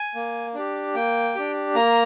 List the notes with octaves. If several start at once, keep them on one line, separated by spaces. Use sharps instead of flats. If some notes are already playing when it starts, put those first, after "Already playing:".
Already playing: G#5
A#3
D4 G4
A#3 G5
D4 G4
A#3 A#5